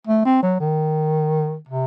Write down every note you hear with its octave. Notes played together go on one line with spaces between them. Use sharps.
A3
C4
F#3
D#3
C3